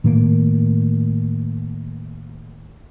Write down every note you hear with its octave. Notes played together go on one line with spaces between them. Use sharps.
A2 D#3 A3 A#3